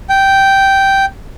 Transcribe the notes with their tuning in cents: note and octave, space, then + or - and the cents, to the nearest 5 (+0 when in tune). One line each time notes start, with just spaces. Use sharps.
G5 -5